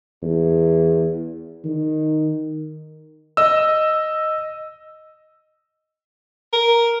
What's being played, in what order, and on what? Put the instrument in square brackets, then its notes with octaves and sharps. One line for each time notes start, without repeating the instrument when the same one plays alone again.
[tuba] E2
D#3
[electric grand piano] D#5 E6
[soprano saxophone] A#4